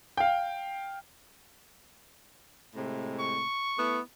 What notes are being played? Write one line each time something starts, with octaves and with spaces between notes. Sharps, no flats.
F5 G5
A2 C3 G#3
C#6
A3 B3 E4